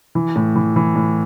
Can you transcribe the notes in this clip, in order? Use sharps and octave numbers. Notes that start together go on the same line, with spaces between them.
E3
A2
E3
E3
A2